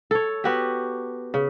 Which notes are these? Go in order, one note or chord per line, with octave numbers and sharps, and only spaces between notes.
A4 C#5
B3 F#4 G4
C#3